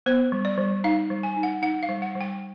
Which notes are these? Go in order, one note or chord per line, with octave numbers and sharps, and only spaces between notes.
B3 C5
G3
D5
G3
D#4 F5
G3
G#5
D#4
F#5
D#4 F#5
F5
G3
F#5
G3
G5